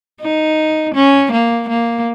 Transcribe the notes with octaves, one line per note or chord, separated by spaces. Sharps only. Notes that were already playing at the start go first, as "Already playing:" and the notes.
D#4
C#4
A#3
A#3